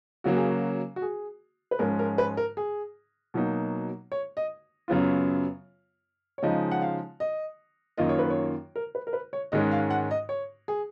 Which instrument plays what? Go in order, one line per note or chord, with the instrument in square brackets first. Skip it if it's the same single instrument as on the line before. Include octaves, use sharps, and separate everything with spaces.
[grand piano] C#3 F#3 A#3 [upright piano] F#4
[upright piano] G#4
F#4
F#4
G#4
B4
[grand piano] G#2 F3 G#3 C#4 F4 [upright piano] A#4
[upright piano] A#4
B4
A#4
G#4
[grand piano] B2 F#3 A#3 D#4
[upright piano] C#5
D#5
[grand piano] F#2 C#3 F#3 B3 F4
[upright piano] C#5
[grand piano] C#3 F3 G#3 D#4 [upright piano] D#5
[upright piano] F#5
F5
D#5
[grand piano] F#2 D#3 A#3 F4 [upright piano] D#5
[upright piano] C#5
B4
C#5
A#4
B4
A#4
B4
C#5
[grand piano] G#2 D#3 G#3 C#4 [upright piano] D#5
[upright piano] F5
F#5
D#5
C#5
G#4